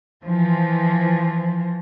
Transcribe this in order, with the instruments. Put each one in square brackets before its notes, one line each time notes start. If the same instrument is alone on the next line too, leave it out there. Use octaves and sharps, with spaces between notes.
[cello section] E3 F3